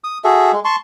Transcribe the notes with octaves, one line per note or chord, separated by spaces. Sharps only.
D#6
F#4 G#4 A4 E5
G#3
A5 C6 C#6